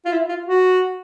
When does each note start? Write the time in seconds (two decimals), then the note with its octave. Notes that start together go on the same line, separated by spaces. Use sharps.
0.05 F4
0.12 E4
0.29 F4
0.46 F#4